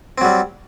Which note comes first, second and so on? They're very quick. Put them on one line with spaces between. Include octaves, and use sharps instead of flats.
C4 F#3 G3